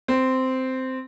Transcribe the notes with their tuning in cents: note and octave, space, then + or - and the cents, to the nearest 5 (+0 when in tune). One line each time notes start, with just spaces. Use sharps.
C4 -10